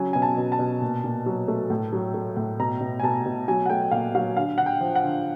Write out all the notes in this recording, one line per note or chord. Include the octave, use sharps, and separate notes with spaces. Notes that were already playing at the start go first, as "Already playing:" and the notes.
Already playing: C#3 F#3 G#5
B2 G#5
A5
B2
A5
B2
A#2
A#2
F#3
A3
A2
F#3
A3
A2
B2 A#5
B2
G#5
B2 A5
B2
F#3 G#5
F#5
A3 G5
A#2 F5
F#3 F5
D3 F5
D3 F#5
G5
F3
F#5
D3